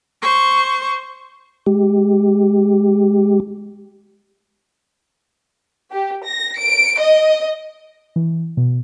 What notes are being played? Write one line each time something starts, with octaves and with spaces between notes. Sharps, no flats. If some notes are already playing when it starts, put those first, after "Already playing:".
C5 C#6
G#3 G4
G4
A#6
D7
D#5
E3
B2